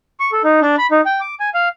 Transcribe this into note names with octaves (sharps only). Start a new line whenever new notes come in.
C#6
A4
D#4
D4
B5
D#4
G5
D6
G#5
F5